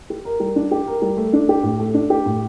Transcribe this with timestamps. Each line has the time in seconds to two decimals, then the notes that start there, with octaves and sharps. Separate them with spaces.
0.10 G4
0.25 A#4
0.40 G3
0.56 D4
0.71 G4
0.87 A#4
1.02 G3
1.17 A3
1.33 D4
1.49 G4
1.63 A2
1.80 A3
1.94 D4
2.10 G4
2.26 A2